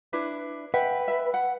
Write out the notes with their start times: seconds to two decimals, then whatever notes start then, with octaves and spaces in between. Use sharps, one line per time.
0.13 D4 E4 B4
0.74 B4 E5 F#5 G5
1.08 E5
1.34 F#5